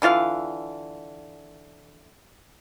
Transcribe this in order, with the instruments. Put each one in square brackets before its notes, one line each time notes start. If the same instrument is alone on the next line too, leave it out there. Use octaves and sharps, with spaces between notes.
[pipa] D3 E3 F4 F5